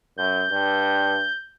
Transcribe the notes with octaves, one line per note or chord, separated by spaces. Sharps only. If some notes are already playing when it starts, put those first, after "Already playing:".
F#2 G6
G2